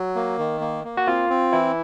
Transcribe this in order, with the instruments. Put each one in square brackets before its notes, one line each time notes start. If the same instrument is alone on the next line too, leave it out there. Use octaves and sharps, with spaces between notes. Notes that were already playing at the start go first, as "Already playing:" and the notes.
Already playing: [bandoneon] F#3
A#3
D#3
A#3
A#3
[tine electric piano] F#4
[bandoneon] C4 [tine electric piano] F4
[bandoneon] C4
[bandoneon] E3 [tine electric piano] E4